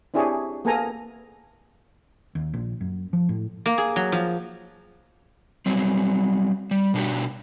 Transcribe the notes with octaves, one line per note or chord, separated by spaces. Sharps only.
C4 D4 E4 G4 G#4 C#5
A#3 B3 G#4 A4 G#5 A#5
D#2
A#1
F#2
F3
A2
A#3
G#4
F#3
F3
F#3 G3 C4
G3
B2 D4 F#4 G4